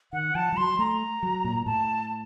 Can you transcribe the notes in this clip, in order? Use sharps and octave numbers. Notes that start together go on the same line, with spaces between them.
D#3 F#5
F3 A5
F3
F#3 C6
A3 A#5
F#3
A#2
A2 A5